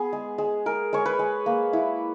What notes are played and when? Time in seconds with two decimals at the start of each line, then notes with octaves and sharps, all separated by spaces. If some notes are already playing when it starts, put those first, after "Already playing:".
Already playing: B3 G#4
0.13 G#3
0.38 G#3
0.66 G#3 A#4
0.93 G#3 C#5
1.06 B4
1.19 G#3
1.46 A#3
1.73 E4